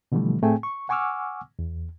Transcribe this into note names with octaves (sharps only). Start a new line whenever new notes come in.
B2 D3 E3 F3 G3 A3
A2 A3 C4 G#4 G5 G#5
C#6
F#5 G#5 C#6 D6 E6 F6
E2